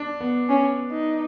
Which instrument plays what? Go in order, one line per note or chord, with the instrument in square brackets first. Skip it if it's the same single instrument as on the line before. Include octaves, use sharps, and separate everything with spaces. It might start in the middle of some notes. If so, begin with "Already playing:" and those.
Already playing: [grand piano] D4
B3
[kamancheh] C#4
D#4